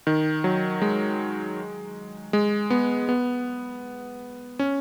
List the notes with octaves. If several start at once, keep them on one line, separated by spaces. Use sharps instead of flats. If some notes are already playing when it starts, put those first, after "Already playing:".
D#3
F#3
G#3
G#3
B3
B3
C#4